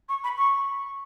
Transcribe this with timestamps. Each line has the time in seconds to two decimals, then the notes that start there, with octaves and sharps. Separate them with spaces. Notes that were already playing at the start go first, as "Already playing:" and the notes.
0.09 C#6
0.24 B5
0.37 C#6